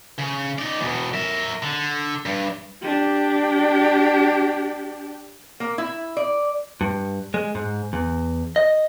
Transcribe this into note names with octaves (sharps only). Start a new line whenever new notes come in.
C#3
D#4 D5
E2 B2
A#4 E5
D3
G2
D4 G4
A#3
E4
D5
G2
G#3
G#2
E2
D#5